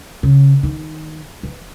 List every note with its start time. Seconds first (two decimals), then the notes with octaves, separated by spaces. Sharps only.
0.23 C#3
0.63 D#3
1.43 E3